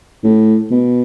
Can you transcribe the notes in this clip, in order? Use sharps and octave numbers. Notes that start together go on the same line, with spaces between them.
A2
B2